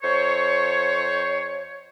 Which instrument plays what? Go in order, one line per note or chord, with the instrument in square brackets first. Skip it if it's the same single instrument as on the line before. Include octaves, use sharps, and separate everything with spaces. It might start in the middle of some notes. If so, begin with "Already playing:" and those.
[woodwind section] F2 C5 C#5